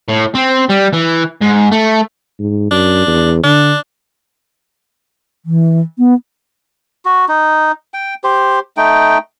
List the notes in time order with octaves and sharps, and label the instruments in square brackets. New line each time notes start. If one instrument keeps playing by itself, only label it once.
[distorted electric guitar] A2
C4
G3
E3
G#2
A3
[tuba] G#2
[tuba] F#2 [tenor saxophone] D4
[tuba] E2
[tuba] D3 [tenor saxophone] D4
[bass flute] E3
B3
[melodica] F#4
D#4
G5
G4 C5
A3 D#4 G5